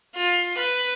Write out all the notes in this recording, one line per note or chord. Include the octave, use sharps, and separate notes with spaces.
F4
B4